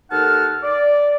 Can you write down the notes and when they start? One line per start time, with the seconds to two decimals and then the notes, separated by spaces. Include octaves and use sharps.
0.11 D#2 D#4 A4 F#5 A5 F6
0.63 D5